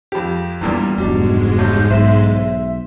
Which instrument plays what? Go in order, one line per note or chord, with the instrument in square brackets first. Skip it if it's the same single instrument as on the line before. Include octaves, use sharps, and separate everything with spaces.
[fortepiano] F2 G4
[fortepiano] E2 A#2 G3 [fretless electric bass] G2
[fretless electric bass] F1 E2 B2 [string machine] G#2 G#3 [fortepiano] G3 D4 [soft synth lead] F#4
[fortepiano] A1 [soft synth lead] G6
[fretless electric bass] B1 [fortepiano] C5 [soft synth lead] E5